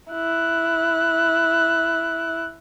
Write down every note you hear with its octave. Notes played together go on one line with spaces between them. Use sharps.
E4 F#6